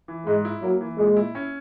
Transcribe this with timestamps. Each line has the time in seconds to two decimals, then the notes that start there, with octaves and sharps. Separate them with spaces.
0.08 E3
0.26 G#2 G#3
0.45 E4
0.62 F#3 A#3
0.81 E3
0.98 A#2 G#3
1.16 E4
1.35 C#4